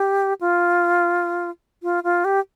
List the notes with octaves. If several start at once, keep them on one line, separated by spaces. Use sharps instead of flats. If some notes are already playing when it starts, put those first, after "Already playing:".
Already playing: G4
F4
F4
F4
G4